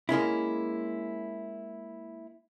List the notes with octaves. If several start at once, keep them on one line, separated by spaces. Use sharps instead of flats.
G#3 A#3 C#4 E4